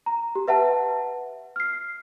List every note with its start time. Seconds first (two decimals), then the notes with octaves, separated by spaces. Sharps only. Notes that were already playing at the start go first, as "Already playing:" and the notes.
0.06 A#5
0.35 G4
0.48 B4 E5 F#5 A5
1.56 F6 C7